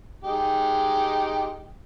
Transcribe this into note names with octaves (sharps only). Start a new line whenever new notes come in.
G#3 D#4 G4